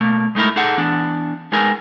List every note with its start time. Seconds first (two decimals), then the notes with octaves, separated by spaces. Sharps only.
0.01 B2 A3 A#3
0.35 G#3 A3 D#4 E4 A#4
0.56 D#4 G#4 A4 F#5
0.78 E3 B3 D4
1.52 G#3 B3 D#4 G#4 A#4 G#5